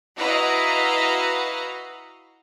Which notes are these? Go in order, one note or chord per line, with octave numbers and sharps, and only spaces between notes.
E4 F#4 B4 D#5 F5 A#5